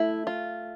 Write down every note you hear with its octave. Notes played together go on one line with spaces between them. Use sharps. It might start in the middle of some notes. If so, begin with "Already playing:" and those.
Already playing: A3 E4
F4